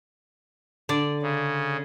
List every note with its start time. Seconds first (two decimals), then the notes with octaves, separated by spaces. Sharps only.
0.89 D3 D5
1.22 C#3